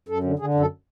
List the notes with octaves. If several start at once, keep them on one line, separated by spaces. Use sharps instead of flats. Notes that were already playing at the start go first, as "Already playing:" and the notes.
F#2 A4
D3
D3 G#4
F#2
A4